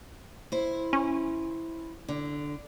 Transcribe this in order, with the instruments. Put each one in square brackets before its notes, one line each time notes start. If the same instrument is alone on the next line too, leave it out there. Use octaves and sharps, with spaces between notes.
[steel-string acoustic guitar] E4 C5
[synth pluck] C#4
[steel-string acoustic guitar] D3